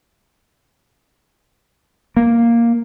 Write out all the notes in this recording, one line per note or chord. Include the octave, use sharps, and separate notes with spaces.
A#3